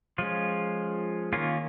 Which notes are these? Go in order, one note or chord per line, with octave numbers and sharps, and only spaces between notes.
F3 G#3 C#4 F4
D#3 A#3 C#4 F4